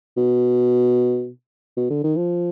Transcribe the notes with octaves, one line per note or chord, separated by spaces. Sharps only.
B2
B2
D3
D#3
F3